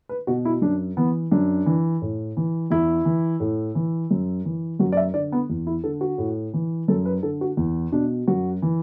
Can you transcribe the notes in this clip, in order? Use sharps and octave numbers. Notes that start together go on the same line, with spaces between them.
B4
B2 F#4
E4
F#2 D4
E3 B3
F#2 D4
E3
A2
E3
E2 E4
E3
A2
E3
F#2
E3
F#2 F#4
D5
E5
D3 D5
B3
E2
E4
D3 A4
F#4
A2
E3
F#2 A4
B4
D3 A4
F#4
E2
B2 D4
F#2 F#4
E3